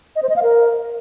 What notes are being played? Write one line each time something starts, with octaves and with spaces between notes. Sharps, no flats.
D#5
C5
D#5
F5
A#4